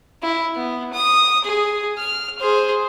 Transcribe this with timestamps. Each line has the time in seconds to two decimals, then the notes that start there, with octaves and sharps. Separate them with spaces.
0.23 E4
0.56 B3
0.93 D#6
1.44 G#4
1.98 F6
2.39 G#4 C5